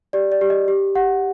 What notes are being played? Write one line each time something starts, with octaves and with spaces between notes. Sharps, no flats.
G4 D5
D5
G4
D#5
G4
G4 F#5